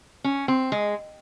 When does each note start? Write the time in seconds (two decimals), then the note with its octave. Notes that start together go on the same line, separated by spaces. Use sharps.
0.24 C#4
0.48 C4
0.72 G#3